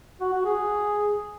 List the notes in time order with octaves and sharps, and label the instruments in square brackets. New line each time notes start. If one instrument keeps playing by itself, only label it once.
[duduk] F#4
F#4
G#4